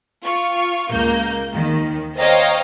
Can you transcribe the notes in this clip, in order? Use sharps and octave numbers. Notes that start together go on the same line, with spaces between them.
F4 C#6
C#2 A#3 G6
D#2 D#3
C5 C#5 D#5 F5 G5 A#5